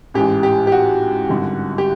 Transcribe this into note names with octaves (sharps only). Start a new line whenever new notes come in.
A1 G#2 E3 G4
G4
G4
F#4
G#1 G2 D3
G4